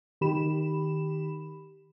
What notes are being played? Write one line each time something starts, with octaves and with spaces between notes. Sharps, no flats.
D#3 G4 B5 E7